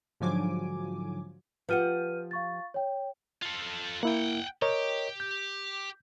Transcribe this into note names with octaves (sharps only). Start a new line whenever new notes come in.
G#2 D3 F3 F#3 G#5 D6
F3 G4 B4 F#5 F6 D#7
F5 C#6 A6
C#5 G5
F4 A4
A#3 E4 F#5 G5
G4 A#4 C#5 D#5
G6